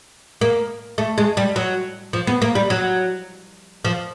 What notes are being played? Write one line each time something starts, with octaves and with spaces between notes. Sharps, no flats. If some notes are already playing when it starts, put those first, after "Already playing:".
A#3
A3
G#3
G3
F#3
F3
B3
A#3
G3
F#3
F3